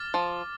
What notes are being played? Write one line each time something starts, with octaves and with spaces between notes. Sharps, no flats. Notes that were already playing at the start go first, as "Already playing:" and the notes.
Already playing: D6 F6 A6
F3